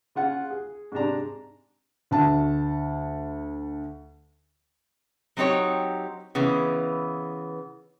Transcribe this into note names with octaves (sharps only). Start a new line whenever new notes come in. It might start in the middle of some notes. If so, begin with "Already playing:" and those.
C#3 F4 F#5 G#5
G#4
G#2 C3 D4 A#5
D2 A5
F#3 C4 D#4 G4 C#5
C#3 E3 B3